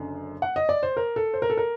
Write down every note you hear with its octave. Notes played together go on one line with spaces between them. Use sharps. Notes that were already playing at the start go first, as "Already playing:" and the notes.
Already playing: F#1 F#2 D3
F#5
D#5
D5
C5
A#4
A4
C5
A#4
A4
A#4